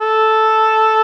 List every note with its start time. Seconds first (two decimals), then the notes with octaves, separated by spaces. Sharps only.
0.01 A4